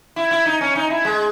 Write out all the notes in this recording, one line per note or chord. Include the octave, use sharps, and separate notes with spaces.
E4
E4
D#4
C#4
D#4
E4
G#3